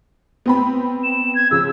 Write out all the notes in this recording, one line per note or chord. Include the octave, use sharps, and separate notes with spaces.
B3 C4 B5
E7
G#6
C#3 F3 E6